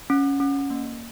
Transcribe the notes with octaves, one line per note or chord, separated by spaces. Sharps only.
C#4
C#4
A#3